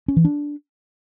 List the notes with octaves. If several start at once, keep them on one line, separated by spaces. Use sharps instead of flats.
C#4
E3
D4